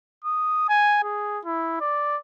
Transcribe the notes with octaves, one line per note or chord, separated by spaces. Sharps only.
D#6
G#5
G#4
E4
D5